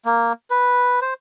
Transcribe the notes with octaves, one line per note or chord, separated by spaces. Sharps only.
A#3
B4
C5